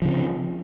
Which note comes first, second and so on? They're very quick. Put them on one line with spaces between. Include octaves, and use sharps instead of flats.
F3 C#3 C4